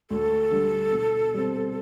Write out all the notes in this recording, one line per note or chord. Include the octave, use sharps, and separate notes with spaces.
D2 A4
D3 G3
B2
G3 C4